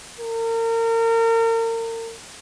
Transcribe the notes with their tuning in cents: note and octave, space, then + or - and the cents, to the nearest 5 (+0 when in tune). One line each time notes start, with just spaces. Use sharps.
A#4 -35